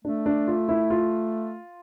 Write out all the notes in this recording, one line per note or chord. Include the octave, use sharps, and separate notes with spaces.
A3 D4
D4
F4
E4
F4